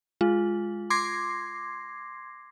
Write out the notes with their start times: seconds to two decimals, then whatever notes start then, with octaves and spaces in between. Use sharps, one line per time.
0.21 G#3 F4
0.90 C6 D6 G#6 A#6 C7